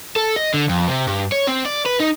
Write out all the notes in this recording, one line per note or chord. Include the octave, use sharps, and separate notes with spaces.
A4
D#5
D3
F2
C3
G2
C#5
C4
D5
B4
D#4